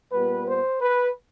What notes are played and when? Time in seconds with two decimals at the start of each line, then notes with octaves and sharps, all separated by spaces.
0.13 A#2 G3 B3 B4
0.47 C5
0.81 B4